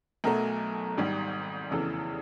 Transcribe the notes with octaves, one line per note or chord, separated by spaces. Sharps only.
B1 B2 F#3 A3 A#4
G#1 G#2 D#3 G3
F1 E2 C#3 E3 A4